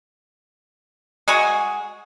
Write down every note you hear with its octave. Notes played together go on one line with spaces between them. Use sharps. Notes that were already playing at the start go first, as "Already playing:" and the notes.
G#3 F#4 G#4